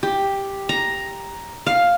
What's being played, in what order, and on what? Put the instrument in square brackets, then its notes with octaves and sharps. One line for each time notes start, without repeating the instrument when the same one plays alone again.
[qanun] G4
A#5
F5